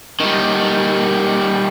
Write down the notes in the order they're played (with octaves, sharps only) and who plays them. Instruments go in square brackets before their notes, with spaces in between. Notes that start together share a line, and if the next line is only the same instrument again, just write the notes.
[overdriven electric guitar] D#3 G3